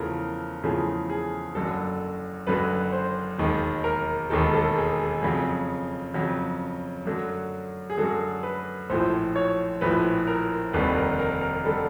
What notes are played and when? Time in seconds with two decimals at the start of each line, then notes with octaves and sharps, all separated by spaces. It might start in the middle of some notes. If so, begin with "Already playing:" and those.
Already playing: E2 C#3 F3 A3 A#4
0.63 E2 C#3 F3 A3 G#4
1.10 G#4
1.55 F#1 F#2 D3 F#3 A4
2.46 F#1 F#2 D3 F#3 B4
2.92 C5
3.38 E1 D#2 D#3 G#3
3.84 A#4
4.30 E1 D#2 D#3 G#3 A4
4.53 A4
4.76 G#4
4.99 G#4
5.22 F2 C#3 F#3 G#4
6.14 F2 C#3 F#3
7.05 F#2 D3 F#3
7.90 G#4
7.98 F#2 D3 F#3 A4
8.43 B4
8.90 A#1 A2 F3 C5
9.36 C#5
9.81 A#1 A2 F3 B4
10.27 A#4
10.73 F1 D#2 D3 G3 B4
10.96 A#4
11.19 A#4
11.41 A#4
11.65 D3 G3 A4